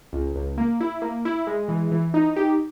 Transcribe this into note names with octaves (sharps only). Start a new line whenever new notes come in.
C#2
C#2
A#3
E4
A#3
E4
G#3
E3
E3
D#4
G4